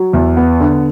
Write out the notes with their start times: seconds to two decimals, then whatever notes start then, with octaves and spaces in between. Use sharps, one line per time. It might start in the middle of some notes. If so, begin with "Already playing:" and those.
Already playing: F#3
0.13 E2
0.37 B3
0.60 D3